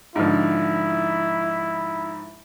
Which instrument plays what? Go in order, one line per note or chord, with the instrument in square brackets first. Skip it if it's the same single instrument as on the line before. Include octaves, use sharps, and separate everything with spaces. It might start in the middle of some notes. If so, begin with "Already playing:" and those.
[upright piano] G#2 D3 F3 [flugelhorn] E4